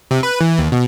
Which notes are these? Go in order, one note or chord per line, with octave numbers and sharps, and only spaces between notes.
C3
B4
E3
D#2
B2